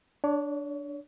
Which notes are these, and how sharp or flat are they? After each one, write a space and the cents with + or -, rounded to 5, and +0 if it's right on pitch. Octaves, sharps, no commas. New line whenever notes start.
D4 +0 C#5 +35